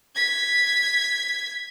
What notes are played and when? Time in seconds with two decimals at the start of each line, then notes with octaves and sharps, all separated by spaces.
0.16 G#6 B6